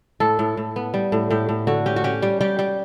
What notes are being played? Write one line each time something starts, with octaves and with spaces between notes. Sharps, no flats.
A2 A4
A2
A2
B3
G3
A2
A2 G4
A2
D3 F#4
C#4 G4
F#4
C#4 G4
G3
G3 G4
G3